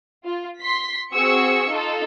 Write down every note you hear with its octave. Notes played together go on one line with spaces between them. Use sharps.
F4
C6 B6
C4 F#4 G#4 C#6 E6 C#7
D#4 F4 A4